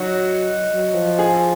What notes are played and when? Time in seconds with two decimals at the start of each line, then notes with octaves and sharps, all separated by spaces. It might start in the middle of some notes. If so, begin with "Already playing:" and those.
Already playing: F#3 D#4 F#4
0.70 F#3
0.95 F3
1.19 G#4